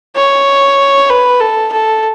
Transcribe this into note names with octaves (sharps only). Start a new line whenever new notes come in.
C#5
B4
A4
A4